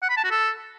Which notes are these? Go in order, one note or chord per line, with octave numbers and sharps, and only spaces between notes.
F#5
B5
A5
F#4
A4